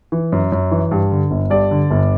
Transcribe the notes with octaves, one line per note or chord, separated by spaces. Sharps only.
E3
F#2
F#2
E3
G2
D3
G1
G2 D5
D3
G1